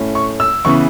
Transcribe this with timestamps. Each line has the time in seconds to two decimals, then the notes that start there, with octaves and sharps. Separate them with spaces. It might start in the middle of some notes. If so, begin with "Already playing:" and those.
Already playing: A2 A3 C#4
0.15 C#6
0.40 E6
0.65 C#3 E3 B3 E4 C#6